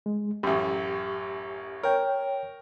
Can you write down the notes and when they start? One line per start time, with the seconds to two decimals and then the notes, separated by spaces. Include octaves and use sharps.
0.06 G#3
0.43 A1 F#2 G4
1.83 A#4 C#5 G5